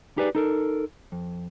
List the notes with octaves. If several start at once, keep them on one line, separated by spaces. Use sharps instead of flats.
D#4 G4 G#4 B4 D5
D#4 A4 A#4
F2